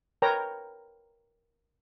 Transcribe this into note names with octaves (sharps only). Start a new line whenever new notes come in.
A#4 B4 C#5 G5 A#5